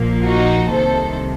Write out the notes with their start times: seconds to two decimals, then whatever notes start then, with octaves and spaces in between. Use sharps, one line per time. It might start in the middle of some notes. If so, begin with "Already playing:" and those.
Already playing: A#1 A#2 F3 A#3
0.25 D#4 F#4
0.72 C2 C3 D#3 A4 C5